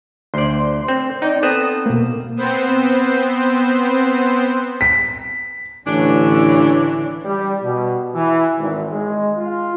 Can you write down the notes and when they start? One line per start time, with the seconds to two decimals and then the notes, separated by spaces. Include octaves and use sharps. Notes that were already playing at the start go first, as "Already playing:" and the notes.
0.34 D2 C5 D5 C6
0.88 C4
1.22 D#4 D5 G5
1.43 B3 C4 A4 D#6 E7
1.86 B2 A#3
2.37 B3 C4 C5
4.81 B6
5.86 A1 D3 E3 C#4 D4
7.25 G3
7.62 B2
8.15 E3
8.59 G#1
8.91 G#3
9.37 F4